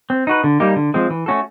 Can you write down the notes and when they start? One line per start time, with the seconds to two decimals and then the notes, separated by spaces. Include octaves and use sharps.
0.10 C4
0.27 D#4 F#4 B4
0.44 D3
0.60 G3 A#3 D#4 G4
0.76 D3
0.94 F3 G#3 C4
1.10 E3
1.26 A3 C#4 F#4 A4